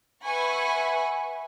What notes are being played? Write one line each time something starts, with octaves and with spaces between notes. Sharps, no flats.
B4 E5 F#5 G#5 B5 C#6